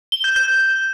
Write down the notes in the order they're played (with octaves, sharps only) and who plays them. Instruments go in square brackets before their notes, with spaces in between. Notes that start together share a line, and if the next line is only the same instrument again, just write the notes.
[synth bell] G7
G6
G6